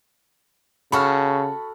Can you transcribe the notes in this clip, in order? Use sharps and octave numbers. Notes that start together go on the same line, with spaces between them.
C#3 F#4 A4 B5 C#6 F6